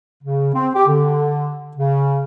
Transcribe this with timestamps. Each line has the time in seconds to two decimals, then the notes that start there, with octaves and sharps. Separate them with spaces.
0.23 C#3
0.55 C4
0.75 G4
0.88 D3
1.77 C#3